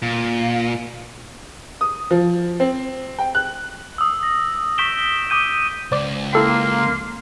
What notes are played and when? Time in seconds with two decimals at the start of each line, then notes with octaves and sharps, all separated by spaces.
0.02 A#2
1.81 D#6
2.11 F3
2.60 C4
3.19 G5
3.35 F#6
3.98 D#6 E6
4.23 A#6
4.78 C#6 G6 B6 D7 E7 G7
5.30 D6 D#6 G6 D#7
5.92 C#2 C5 D5 D6
6.33 A#3 E4 A4 G5 C6